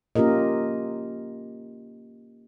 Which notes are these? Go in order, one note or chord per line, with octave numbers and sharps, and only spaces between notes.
A#3 C#4 F4 G4 A#4 D#5